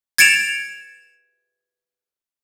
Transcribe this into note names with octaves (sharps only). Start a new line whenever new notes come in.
G#6 A6 C#7 D7 E7 F7